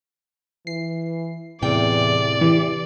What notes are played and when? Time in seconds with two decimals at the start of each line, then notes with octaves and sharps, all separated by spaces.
0.67 E3 C7
1.62 E2 A2 C3 D5 G5
2.41 E3 G4